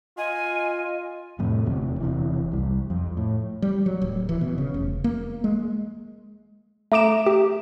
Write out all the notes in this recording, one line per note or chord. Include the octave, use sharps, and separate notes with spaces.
F4 D#5 G#5
F2 A2 C3
E1 D2 C3
E1 C3 E3
C2 G3
F2
A2
G3
F#3
D1
E3
B2
C#3
F1
A#3
G#3
A3 A#5 D6 D7 E7
G4